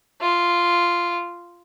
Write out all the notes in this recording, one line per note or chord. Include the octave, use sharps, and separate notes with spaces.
F4